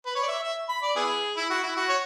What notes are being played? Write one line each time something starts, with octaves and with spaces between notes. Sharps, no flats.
B4
C#5
D5
E5
E5
B5
D5
B3 E4 G#4
E4
F#4
E4
F#4
C#5